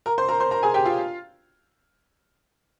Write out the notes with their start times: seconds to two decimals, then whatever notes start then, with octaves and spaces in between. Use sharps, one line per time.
0.06 A#4 A#5
0.18 C5 C6
0.29 A#4 A#5
0.40 C5 C6
0.51 A#4 A#5
0.63 G#4 G#5
0.74 G4 G5
0.85 F4 F5